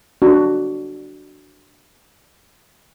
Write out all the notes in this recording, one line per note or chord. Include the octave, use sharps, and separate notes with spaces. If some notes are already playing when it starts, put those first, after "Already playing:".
D4 F#4